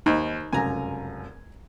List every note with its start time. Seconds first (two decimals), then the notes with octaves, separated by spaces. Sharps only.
0.06 D#2 D#4 C5 B5
0.53 F1 C#2 F#2 G#5 A#5